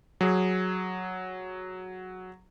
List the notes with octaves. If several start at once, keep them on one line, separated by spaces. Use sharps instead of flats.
F#3 G#4